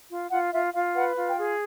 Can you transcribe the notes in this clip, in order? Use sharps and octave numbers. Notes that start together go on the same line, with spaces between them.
F4
F4 F#5
F4 E5
F4 F5
B4 F#5
F4
G5
G#4